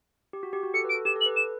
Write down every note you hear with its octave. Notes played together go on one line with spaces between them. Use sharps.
G4
F#4
G4
F#4
A4 C#7
B4
D7
A4
G4 E7
A4
F#7
B4
E7